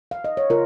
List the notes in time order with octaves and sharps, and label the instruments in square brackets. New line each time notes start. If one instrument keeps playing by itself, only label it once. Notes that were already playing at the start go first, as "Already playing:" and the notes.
[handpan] F5
D#5
C#5
C#3 F4 A#4